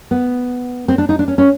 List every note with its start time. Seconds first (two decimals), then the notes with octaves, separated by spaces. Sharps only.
0.11 B3
0.88 C4
0.98 D4
1.09 D#4
1.19 D4
1.28 C#4
1.38 C#4